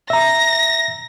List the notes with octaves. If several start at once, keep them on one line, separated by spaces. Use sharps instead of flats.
E5 A#5 A#6